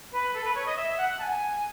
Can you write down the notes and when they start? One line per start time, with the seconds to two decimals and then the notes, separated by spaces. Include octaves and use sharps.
0.12 B4
0.33 A4
0.44 B4
0.55 C#5
0.65 D#5
0.76 E5
0.97 F#5
1.19 A5
1.22 G#5